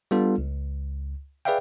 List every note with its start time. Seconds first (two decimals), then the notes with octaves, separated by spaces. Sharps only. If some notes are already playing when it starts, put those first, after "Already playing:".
0.11 G3 B3 D4 F4 A4
0.38 C#2
1.45 G#4 B4 D5 E5 F5 G5